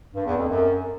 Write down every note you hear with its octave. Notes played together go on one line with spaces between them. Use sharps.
G2
E2
F2
F#2